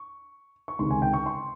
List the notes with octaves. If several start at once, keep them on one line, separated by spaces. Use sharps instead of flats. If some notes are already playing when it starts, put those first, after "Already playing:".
Already playing: C#6
C#6
C#2 C3 D#3 C6
G#5
G5
C#6
C6